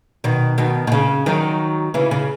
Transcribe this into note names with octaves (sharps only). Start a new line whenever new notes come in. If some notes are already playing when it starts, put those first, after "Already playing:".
B2 D#3
B2 D#3
B2
C#3
D#3 F#3
C#3 E3
C#3